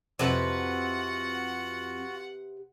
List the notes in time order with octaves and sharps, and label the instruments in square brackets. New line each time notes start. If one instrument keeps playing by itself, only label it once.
[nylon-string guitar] F2 [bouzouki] C3 B4 [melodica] F4 F#4 [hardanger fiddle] F#5